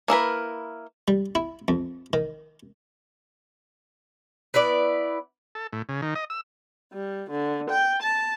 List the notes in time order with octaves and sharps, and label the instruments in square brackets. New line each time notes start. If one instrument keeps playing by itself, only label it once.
[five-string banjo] A#3 E4 A#4 B4
[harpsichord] G3
E4
F2
D#3
[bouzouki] B3 E4 B4 D5
[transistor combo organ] A4
A2
C#3
D#3
D#5
E6
[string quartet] G3
D3
G5
A5